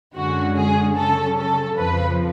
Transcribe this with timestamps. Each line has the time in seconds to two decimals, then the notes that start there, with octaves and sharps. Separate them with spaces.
0.16 F#2 D3 G#3 C#4 F#4
0.57 G#4
0.96 C#3 F#3 C#4 A4
1.36 A4
1.76 F2 C#3 F3 B4